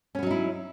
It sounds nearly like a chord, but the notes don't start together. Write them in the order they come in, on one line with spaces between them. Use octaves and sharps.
C#4 B3 F#3 D#4 E4